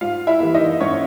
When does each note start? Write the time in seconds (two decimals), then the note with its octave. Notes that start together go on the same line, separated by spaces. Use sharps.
0.01 G#2 F4 F5
0.27 E4 E5
0.40 E3 G3 A#3
0.54 D#4 D#5
0.80 G#2 C#4 C#5